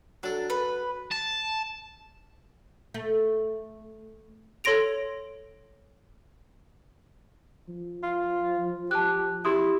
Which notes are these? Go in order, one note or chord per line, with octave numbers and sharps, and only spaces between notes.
F#3 D4 A4
B4
A5
A3
A4 C#5 C6 A#6 D7 F7
F3
F4
G4 A5 F#6
E4 G4 C6 D#6